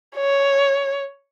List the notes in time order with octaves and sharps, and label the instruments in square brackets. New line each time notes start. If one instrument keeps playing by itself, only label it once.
[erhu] C#5